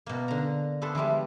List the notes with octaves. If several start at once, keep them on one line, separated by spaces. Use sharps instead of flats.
B2 A#3
D3 A#5
B3 D4 A4 B4 C5
E3 F3 G3 G#3